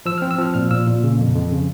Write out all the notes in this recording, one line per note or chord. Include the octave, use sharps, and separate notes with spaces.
F3 E6
C4 F6
E6
F3 F6
A#2 F6
A#2 E6
A#2
C#3
F2
F2
C#3